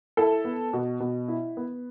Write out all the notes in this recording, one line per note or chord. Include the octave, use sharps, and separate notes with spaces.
E4 A4
B3
B2
B2
E4
B3